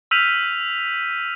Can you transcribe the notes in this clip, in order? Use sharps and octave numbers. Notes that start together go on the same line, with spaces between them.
E6 F6 G6 B6 D#7 F7